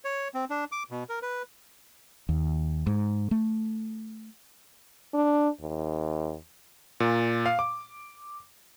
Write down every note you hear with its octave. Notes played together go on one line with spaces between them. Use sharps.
C#5
C4
D4
D6
B2
A#4
B4
D#2
G#2
A3
D4
D#2
A#2
F5
D6